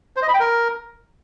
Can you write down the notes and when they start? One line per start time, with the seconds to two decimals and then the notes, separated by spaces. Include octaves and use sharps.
0.16 C5
0.22 D#5
0.28 B5
0.34 G5
0.40 A#4